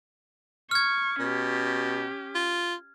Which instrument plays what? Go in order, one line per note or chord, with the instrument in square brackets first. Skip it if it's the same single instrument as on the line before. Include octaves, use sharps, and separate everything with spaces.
[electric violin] C#6 [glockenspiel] F6 G#6
[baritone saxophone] B2 [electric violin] C#4 G4
[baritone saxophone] F4